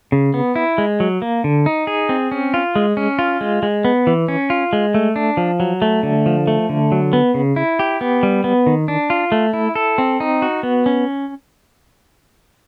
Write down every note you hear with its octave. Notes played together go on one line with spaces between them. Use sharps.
C#3
B3
E4
G#3
F#3
A#3
D3
D#4
G#4
C4
C#4
F4
G#3
C#4
F4
G#3
G#3
B3
E3
C#4
F4
G#3
A3
D4
F3
F#3
A3
D3
F3
A3
D3
F#3
B3
C#3
E4
G4
B3
G3
B3
D#3
D4
F4
A3
E4
A4
C4
D#4
F#4
B3
C#4